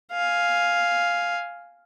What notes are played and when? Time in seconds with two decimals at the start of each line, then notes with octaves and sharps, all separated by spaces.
0.12 F5 G#5